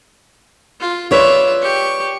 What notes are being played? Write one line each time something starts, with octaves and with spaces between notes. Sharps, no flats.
F4
F4 B4 C#5 D5 E5
G4 C#6